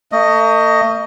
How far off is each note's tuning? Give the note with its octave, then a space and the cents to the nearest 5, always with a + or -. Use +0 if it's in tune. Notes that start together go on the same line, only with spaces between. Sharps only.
A3 +35 D#5 +0